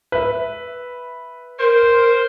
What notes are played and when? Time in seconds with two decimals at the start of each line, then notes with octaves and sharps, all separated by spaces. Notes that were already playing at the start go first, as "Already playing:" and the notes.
0.12 B4 E5
1.59 A#4 C5